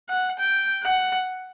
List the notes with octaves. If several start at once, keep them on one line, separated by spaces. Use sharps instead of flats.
F#5
G5
F#5